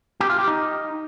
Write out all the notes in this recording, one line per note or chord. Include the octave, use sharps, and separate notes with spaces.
G4
F4
G4
D#4